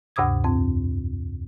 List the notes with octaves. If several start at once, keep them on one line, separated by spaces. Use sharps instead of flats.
D2 G2 C3 D6 D#6 G#6
F2 C4